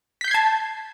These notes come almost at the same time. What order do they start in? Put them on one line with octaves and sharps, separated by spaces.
B6 G6 C7 G#6 A5